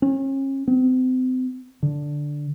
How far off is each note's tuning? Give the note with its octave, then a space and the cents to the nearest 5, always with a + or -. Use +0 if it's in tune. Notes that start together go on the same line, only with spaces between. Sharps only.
C#4 -40
C4 -35
D3 -5